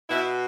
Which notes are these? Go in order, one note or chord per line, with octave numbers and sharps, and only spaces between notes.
B2 E4